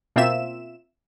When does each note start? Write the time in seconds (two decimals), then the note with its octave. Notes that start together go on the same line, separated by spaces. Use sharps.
0.16 B2 A#3 C4 F4 E5 E7